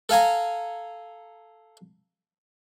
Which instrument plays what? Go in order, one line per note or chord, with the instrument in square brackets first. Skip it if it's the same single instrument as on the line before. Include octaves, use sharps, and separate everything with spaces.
[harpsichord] A4 F5 G#5 A#5